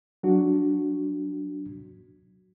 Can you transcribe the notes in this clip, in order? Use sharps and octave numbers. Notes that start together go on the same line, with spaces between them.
F#3 D4 F#4